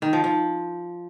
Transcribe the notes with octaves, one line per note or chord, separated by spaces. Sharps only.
D#3
F3
F3